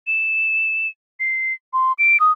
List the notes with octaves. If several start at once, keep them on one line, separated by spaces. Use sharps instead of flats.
E7
C7
C6
D7
D#6